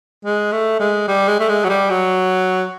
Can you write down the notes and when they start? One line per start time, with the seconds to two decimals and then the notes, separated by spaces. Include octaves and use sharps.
0.25 G#3
0.52 A3
0.80 G#3
1.08 G3
1.28 G#3
1.40 A3
1.49 G#3
1.64 F#3
1.69 G3
1.90 F#3